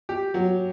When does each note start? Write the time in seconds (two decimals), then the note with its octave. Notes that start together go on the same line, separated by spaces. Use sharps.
0.09 G4
0.34 F#3